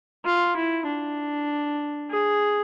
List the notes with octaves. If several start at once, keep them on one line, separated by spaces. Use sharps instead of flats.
F4
E4
D4
G#4